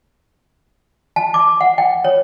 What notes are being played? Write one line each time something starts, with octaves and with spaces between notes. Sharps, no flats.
A5
D6
F#5
G5
C#5